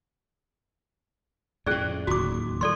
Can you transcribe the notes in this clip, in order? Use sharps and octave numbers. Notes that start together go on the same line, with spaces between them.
F2 A2 C#4 G#4 D5
D1 D#2 F#4 D6
D#3 G3 A4 D5 C6